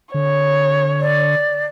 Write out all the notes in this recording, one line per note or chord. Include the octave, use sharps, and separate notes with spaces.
D3 C#5
D5